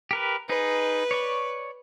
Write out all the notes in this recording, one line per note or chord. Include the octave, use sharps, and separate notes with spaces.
G4 A#4 B4
D#4 G#4 B4
C#5 D5 C#6